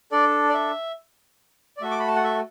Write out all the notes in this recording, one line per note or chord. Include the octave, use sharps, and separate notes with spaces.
D4 A4 D5
D5
E5
D5
A3 F#4 A4 E5
D6
B5
A5
F#5
E5